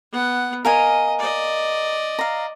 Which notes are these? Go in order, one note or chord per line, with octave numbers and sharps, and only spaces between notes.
B3 F#5
A#4 D#5 F5 G#5
D5 D#5
F5 A#5